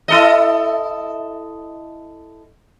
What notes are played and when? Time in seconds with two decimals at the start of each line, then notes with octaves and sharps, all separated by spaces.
0.08 E4 A4 D#5